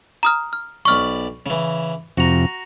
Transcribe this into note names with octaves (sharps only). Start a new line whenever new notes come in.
A#5 D#6 F6
F6
B1 D5 B5 C#6 F6
C#3 E3
F2 C3 F#4 A#5